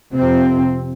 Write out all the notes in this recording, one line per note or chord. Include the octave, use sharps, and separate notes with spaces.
F2 C3 C4